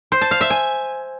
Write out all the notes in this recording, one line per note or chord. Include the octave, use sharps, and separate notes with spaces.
C5
A5
F5
E5
G#5